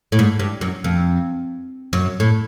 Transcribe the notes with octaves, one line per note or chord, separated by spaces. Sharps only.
A2
G#2
G2
F#2
F2
F#2
A2